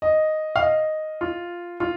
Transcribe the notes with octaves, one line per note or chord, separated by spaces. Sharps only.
D#5
F5
D#5
F4
F4